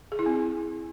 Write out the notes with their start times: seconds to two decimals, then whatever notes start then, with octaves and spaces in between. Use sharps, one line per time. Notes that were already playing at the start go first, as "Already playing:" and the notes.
0.12 G#4
0.19 E4
0.26 C4